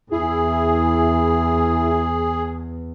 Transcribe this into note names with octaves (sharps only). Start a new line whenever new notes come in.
E2 E4 G#4